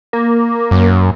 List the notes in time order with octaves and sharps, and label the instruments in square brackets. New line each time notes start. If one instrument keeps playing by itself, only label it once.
[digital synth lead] A#3
[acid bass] F#2